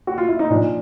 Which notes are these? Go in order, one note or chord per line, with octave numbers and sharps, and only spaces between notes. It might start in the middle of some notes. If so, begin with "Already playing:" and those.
F#4
F4
E4
D#4
A#2 F3 D4